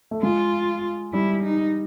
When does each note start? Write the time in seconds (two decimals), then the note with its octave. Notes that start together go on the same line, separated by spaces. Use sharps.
0.11 A3
0.22 G#3 F4
1.13 G3 E4
1.43 D#4